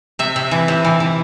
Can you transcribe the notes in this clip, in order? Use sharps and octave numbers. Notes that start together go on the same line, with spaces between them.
C3 E5
C3
E3
C3
E3
E3